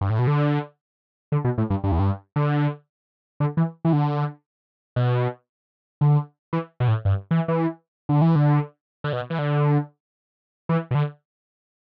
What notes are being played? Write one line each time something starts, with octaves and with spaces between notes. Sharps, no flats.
G2
A2
B2
D3
D3
B2
A2
G2
G2
E2
G2
D3
D3
E3
E3
D3
B2
D3
E3
B2
A2
G2
E3
E3
D3
E3
D3
D3
B2
E3
D3
E3
B2
D3